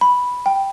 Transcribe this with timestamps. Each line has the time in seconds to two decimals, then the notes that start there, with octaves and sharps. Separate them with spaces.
0.01 B5
0.46 G5